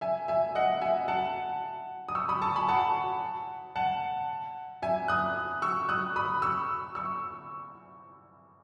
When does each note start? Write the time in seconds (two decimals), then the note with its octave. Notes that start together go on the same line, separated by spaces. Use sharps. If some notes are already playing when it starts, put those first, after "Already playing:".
0.01 E5 G#5
0.28 E5 G#5
0.55 D#5 F#5
0.81 E5 G#5
1.08 F#5 A5
2.09 D#6
2.15 C#6 E6
2.29 B5 D#6
2.42 A5 C#6
2.56 G#5 B5
2.69 F#5 A5
3.76 F#5 A5
4.82 E5 G#5
5.08 D#6 F#6
5.62 C#6 E6
5.89 D#6 F#6
6.16 B5 D#6
6.42 C#6 E6
6.95 C#6 E6